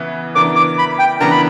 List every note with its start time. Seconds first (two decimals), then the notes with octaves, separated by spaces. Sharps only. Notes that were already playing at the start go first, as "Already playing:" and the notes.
Already playing: C#3 E3 B3
0.35 C#3 E3 B3 D4 A#4 D6
0.56 D6
0.78 B5
0.99 G5
1.20 C#3 E3 B3 D4 A#4 A#5
1.31 B5